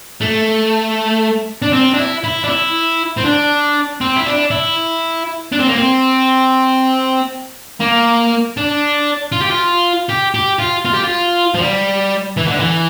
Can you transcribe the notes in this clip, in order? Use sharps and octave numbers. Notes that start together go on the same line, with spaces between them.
A3
D4
C4
D4
E4
E4
D4
E4
C4
D4
C4
E4
D4
E4
D4
C4
A#3
C4
A#3
D4
F4
G4
F4
G4
G4
F4
F4
G4
F4
F3
G3
E3
D3
E3